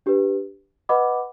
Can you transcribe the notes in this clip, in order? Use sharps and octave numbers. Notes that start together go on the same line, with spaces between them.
D4 G4 B4
B4 D#5 F#5 B5 D6